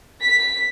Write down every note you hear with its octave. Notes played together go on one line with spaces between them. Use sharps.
B6